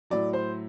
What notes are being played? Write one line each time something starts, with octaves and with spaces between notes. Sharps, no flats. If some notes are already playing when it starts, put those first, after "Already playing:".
A2 F#3 D5
C5